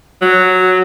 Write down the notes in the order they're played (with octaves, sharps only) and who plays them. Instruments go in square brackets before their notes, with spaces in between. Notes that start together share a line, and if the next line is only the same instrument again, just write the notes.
[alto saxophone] F#3